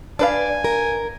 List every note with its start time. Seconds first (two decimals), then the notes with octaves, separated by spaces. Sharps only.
0.19 D4 B4 D5 F5 G#5
0.64 A#4